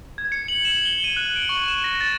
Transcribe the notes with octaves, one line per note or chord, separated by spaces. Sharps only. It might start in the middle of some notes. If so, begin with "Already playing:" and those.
G#6
C#7
F#7
E7
G7
D#7
F#6
D7
C#6
E7
A#6
A6